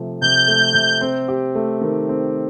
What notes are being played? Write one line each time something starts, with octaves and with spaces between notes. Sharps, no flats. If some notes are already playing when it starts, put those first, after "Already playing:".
Already playing: C3 F3 A3
C3 G6
A3
C3
C4
G4
A3
D#3
C4